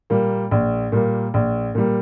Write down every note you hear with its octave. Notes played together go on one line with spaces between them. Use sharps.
A#2 G3 A#3
A#1
A#2 G3 A#3
A#1
A#2 G3 A#3